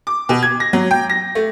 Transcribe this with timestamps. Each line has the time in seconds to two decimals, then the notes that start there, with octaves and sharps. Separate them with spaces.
0.07 D6
0.29 B2
0.42 G#6
0.60 A#6
0.73 F#3
0.91 G5
1.10 A#6
1.35 A3